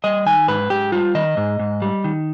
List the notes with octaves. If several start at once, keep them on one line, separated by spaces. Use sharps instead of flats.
G3 D#5
D#3 G#5
G#2 B4
G#2 G4
G3 F4
D#3 D#5
G#2
G#2
G3
D#3